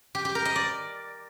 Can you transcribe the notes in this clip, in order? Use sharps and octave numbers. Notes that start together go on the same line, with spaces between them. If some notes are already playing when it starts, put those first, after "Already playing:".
G4
G4
A#4
D#5
D5